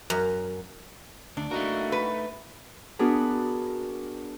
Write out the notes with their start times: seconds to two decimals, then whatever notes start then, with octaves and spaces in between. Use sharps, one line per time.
0.10 F#2
1.37 D2 D4
1.51 A3 A#3 D#4 E4 F#4 A#4
1.92 B4
2.99 B3 D4 F#4 G#4 A#4 B4